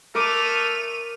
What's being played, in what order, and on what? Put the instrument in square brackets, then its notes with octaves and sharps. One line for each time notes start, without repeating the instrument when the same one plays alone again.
[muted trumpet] A3 [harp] A#4 D6 [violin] D#7 F7